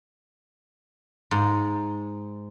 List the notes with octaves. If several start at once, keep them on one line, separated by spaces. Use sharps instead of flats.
G#2